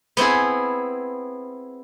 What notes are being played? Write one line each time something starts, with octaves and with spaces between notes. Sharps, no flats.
B3 C4 E4 G#4